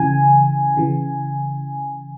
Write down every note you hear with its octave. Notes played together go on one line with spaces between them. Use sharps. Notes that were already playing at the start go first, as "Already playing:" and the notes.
Already playing: C#3 E3 G#5
C#3 E3